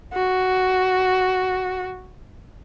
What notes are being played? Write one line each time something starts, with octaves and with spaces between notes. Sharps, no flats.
F#4